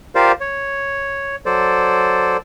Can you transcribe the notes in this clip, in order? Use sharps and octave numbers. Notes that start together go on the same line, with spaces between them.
F4 G4 A#4 C5 D5 F5
C#5
F#3 A4 C5 D5